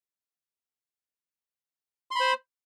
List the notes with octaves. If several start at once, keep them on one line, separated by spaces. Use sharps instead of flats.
C5 B5 C6